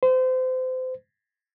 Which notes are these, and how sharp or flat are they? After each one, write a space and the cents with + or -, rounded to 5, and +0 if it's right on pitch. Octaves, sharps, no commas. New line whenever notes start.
C5 -30